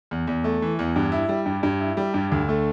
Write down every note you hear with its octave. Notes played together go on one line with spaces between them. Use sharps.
E2
E2
A3
E3
E2
G2
E4
G3
G2
G2
E4
G3
G2
D2
A3